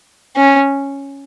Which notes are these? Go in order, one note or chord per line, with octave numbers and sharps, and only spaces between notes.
C#4